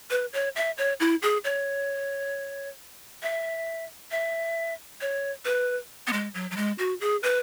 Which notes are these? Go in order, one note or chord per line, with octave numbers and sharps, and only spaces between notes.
B4
C#5
E5
C#5
E4
G#4
C#5
E5
E5
C#5
B4
B3
G#3
F#3
F#3
G#3
F#4
G#4
B4